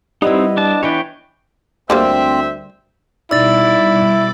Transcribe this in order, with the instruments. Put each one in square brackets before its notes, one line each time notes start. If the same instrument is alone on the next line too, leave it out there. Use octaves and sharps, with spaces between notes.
[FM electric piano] G3 [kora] B3 E4 [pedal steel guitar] C4 D#4 [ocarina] D#5
[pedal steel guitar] D4 A5
[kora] E3 D4 B4 [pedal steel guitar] C#5 G5
[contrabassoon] D2 [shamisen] D3 G3 A#3 [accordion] C4 [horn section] C5 E5
[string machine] B2 G3 D6 [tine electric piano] D#4 D5 [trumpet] E4 [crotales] E6 A6